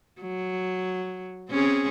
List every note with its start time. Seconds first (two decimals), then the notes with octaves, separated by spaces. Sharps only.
0.22 F#3
1.49 C4 C#4 G#4